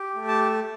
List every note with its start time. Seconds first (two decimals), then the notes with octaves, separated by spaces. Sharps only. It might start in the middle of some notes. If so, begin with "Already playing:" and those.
Already playing: G4
0.15 A3
0.28 A5